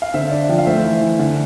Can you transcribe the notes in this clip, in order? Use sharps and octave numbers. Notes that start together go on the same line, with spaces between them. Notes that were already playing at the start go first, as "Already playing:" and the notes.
F5
D3 C5 E5
D4
F3 G5
F5
A3 C5 E5
E3
E3
D3